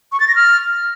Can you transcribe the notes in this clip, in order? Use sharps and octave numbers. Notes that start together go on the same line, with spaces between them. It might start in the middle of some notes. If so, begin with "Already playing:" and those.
C#6
A6
A#6
F6